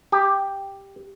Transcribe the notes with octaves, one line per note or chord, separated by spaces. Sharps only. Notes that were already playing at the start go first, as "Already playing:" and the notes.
G4